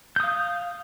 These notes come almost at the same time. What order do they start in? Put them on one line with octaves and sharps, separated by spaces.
G6 D#6 F5